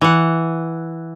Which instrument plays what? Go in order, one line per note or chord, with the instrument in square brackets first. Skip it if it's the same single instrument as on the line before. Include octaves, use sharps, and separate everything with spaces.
[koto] E3 F#5